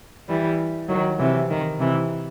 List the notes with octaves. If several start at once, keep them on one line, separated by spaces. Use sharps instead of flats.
E3 G3
D#3 F#3
C3 E3
D#3
C3 E3